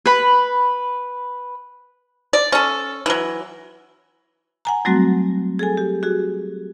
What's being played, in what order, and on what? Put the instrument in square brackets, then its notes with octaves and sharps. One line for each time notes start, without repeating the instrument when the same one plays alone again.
[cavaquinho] B4 B5
[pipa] D5
C#4 A4
E3 F#3
[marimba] F#5 G#5 A#5
F#3 G3 A3 C4 F#4
G#4 A4 G#5
G4
F#4 G#4